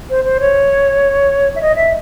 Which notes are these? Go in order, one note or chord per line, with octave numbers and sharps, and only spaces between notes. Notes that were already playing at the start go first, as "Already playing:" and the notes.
C5
C5
C#5
E5
D#5
E5